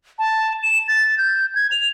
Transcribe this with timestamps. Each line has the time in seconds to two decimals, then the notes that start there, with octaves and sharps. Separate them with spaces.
0.19 A5
0.63 E7
0.88 A6
1.18 G6
1.55 G#6
1.71 F7